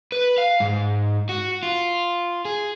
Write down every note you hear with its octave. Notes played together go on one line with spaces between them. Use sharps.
B4
F5
G#2
F#4
F4
G#4